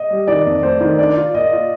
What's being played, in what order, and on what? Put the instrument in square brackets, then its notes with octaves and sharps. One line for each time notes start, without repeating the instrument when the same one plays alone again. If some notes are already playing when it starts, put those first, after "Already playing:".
Already playing: [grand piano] D#5
[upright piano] G3
[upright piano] D#3 [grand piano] D5
[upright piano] F2
[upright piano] A3 [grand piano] C5
[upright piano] D#3
[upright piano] D4 [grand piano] D5
[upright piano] F4
[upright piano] A#2 [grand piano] D#5
[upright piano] F4